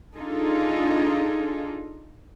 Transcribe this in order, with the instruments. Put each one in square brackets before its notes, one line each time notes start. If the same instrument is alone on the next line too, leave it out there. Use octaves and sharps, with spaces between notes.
[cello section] D4 D#4 F4 G#4 A4